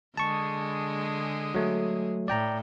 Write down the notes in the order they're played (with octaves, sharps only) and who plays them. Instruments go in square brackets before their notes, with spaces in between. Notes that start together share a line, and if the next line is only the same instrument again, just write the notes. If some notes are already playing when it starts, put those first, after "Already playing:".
[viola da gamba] D3 G#3 G#4 [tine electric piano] A5 C#6
[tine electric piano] F#3 A3
[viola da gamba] A2 [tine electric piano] D5 G5 A#5